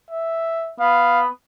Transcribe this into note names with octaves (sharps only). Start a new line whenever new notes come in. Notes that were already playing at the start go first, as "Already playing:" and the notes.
E5
B3 F5